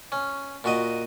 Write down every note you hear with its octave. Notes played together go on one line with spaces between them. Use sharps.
C#4
A#2 F#4 D#5